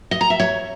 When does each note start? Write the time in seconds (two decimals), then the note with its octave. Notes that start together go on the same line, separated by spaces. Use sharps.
0.11 D#5
0.21 A#5
0.30 E5
0.40 C#5